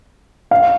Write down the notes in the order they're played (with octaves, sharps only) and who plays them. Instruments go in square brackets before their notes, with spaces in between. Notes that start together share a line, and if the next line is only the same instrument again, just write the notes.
[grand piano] F5